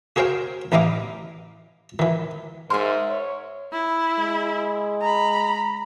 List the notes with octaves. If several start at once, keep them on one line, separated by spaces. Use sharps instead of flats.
F#4 G#4 A#4 C5 F5 G5
A1 E3 D#4 D#5 F5 D6
D#3 E3
G#2 A#4 E5 C6
C#5
E4
G#3
A#5 B5